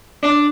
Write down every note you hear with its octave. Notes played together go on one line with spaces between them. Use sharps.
D4